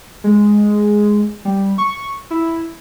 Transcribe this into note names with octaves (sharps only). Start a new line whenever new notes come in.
G#3
G3
C#6
E4